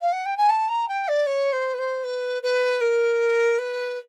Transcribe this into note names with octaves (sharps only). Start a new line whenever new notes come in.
F5
F#5
G5
G#5
A5
A#5
G5
D5
C#5
C5
B4
C5
B4
B4
A#4
B4